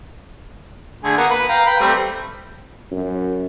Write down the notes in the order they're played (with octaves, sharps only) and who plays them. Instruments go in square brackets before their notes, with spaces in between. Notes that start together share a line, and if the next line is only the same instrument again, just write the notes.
[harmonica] D3 A3 G#4
A#3 B3 F#4
B4
F5 G5 A#5
B4 G5
G3 A3 C4
[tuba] F#2